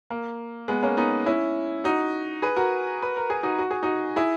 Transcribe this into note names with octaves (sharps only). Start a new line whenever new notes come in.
A#3
G#3 B3
A#3 C#4
B3 D#4
C#4 E4
D#4 F#4
G#4 B4
F#4 A#4
B4
A#4
G#4
D#4 F#4
F#4
G#4
D#4 F#4
E4 G#4